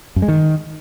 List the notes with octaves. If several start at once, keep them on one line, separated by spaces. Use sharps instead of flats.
F#2
G#3
D#3